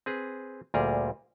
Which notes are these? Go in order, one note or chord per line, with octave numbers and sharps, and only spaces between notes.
C4 G#4 B4
D2 A#2 G3 G#4 A#4